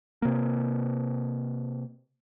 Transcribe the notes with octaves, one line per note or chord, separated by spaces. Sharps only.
C3 A#3